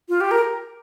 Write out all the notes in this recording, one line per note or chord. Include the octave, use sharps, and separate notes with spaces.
F4
G4
A#4